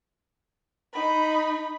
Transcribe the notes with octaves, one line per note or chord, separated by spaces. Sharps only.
D#4 B5